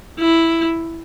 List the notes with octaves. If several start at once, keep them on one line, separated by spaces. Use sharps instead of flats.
E4